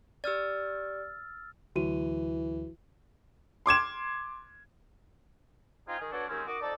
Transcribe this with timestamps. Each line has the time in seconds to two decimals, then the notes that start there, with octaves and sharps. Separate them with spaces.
0.24 G4 D5 E6 F6 A6
1.76 D2 E3 F#3 F#4 D#7
3.66 C6 D6 G#6 E7
5.88 C4 D#4 F4 G#4
5.99 D#3 G#4
6.12 B3 D4 F#4 A4 C#5
6.27 D#2 D#3 G#3 C4 C#4
6.46 D#3 F#4 D#5 D6
6.60 F2 D#4 A4 D5